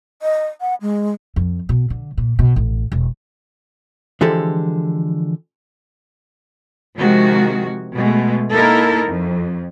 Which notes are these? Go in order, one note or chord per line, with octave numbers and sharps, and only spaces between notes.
D#5
F#5
G#3
F2
B2
D3
A#2
B2
A1
E1
D3 E3 F3 G#3 G4 A4
C3 D#3 F3 G#3 F#4
B2 G#3 A3
A#3 D#4 E4 A4 A#4
F2